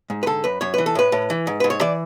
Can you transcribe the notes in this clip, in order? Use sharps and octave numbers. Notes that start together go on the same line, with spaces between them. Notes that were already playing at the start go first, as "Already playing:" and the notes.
G#2
B4
D3 A4
F#2 B4
F#2 C#5
E3 B4
A4
A2 B4
A2
E3
G#2
G#2 B4
C#5
E3 D5